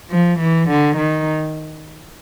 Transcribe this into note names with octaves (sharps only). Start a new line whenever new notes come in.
F3
E3
D3
D#3